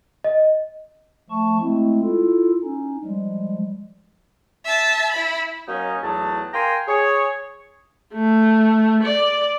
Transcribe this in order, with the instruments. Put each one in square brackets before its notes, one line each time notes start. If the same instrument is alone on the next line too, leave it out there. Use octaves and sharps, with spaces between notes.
[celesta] D#5
[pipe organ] F3 A3 A5 C#6
G#3 A3 C4 E4
E4 F4 A4
C#4 D#4
F3 G3 G#3
[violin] E5 A5
E4 B5
[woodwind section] F#3 A#3 C#4 D#4
E2 A2 F#3 D#4 A5
A#4 F5 G5 G#5 A#5 C6
G#4 C#5
[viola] A3
D5